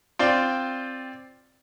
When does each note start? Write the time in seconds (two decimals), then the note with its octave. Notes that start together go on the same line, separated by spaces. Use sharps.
0.19 C4 F4 D5 G5